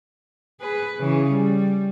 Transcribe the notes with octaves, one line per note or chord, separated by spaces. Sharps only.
G#4 B4
C#3 E3
G3